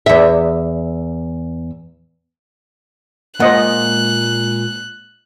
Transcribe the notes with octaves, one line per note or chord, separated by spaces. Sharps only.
E2 E5
A#2 G#3 A#3 C5 D#5 F#5 F#6